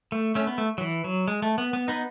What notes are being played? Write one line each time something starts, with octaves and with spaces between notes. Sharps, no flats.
A3
A3 C#4
B3
A3
F#3
E3
F#3
G#3
A3
B3
B3
B3 D#4